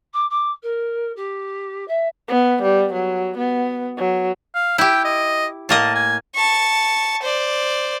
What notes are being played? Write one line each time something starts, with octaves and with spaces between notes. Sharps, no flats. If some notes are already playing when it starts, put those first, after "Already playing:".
D6
D6
A#4
G4
E5
B3
G3
F#3
B3
F#3
F5
E4 G4 G5
D#5
A2 A#3 D#5 A5
G#5
A5 C#6
C5 D5